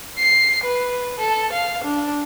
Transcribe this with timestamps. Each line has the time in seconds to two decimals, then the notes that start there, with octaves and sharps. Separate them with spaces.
0.18 C7
0.64 B4
1.19 A4
1.53 F5
1.84 D4